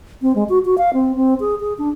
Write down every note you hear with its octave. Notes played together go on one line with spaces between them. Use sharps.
C4
G#3
F#4
F#4
F5
C4
C4
G#4
G#4
D4